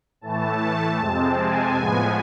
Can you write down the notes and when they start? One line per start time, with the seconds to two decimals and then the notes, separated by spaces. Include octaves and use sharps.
0.21 A2 E3 A3 A5
0.98 F2 C3 G#3 C4
1.37 G#5
1.75 A2 F3 G#3 B3